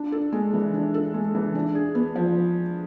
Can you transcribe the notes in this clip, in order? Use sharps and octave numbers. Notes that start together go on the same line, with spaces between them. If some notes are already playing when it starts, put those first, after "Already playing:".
Already playing: D4
A4
G#3
E3
D4
A4
G#3
E3
D4
G#4
B3
F3